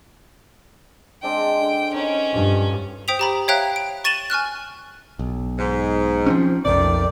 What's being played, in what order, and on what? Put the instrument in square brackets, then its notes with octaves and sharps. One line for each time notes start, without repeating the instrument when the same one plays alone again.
[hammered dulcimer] G#3 C4 D4 [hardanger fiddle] G5
[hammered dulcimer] D3
[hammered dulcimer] D#3 [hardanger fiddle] C#4
[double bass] G2 [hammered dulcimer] F4 A5
[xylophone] C5 G5 D#6 B6 F7
G4 A#5 B5
C#5 E5 F5 G5 A#5 F#6
D7
C#6 A6 D#7 E7 F#7 G7
G#5 C#6 F6 F#6
[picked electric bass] B1
[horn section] G#2
[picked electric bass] F3 C4 C#4
[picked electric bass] B1 F2 C3 [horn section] D#3 A3 D5